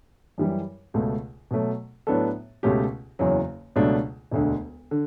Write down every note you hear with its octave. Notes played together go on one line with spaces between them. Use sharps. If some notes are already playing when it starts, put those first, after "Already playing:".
F#2 E3 G3
C#2 B2 A3
B2 F#3 A3
A2 F#3 B3 D4 A4
C#2 B2 A3 C#4 G4
F#1 E2 C#3 F#3
C#2 B2 F#3 A3 D4
E1 D2 D3
D3